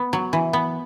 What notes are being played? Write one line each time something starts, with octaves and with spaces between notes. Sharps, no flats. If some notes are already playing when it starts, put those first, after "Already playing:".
Already playing: B3
F#3
E3
B3